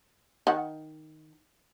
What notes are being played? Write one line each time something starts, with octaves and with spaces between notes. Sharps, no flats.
D#3 F#5